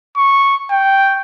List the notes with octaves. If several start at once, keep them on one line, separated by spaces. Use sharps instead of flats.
C#6
G5